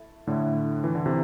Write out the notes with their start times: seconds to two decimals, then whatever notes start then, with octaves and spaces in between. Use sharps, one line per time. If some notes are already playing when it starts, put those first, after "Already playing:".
Already playing: A3 E4 A4
0.27 A2 D3 A3 E4 A4
0.84 E3 A3 E4 A4
0.95 D3
1.06 C3 E3